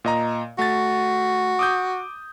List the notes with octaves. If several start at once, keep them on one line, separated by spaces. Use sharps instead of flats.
A#2 D#5 A#5
A3 F#4 A6
D6 D#6 G6